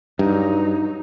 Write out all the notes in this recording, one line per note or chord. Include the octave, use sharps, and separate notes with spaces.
G2 F#3 D#4